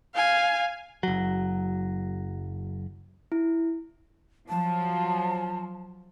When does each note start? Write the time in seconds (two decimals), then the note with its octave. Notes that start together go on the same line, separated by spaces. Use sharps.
0.15 F5 G#5
1.03 F#1 F#3
3.32 E4
4.49 F3 F#3 A5